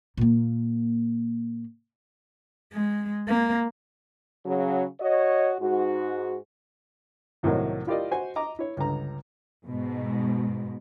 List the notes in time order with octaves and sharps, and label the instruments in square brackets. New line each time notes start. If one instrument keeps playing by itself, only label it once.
[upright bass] A#2 A#3
[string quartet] G#3
A#3
[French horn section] C#3 F#3
F#4 C#5 D#5
G#2 F#4
[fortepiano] C2 A2 C3 D#3 F#3 A#3
E4 F4 G4 A#4 D5 D#5
F#4 C5 G#5
D#5 A#5 D6
E4 C#5
C#2 G2 D3 A#5
[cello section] G#2 B2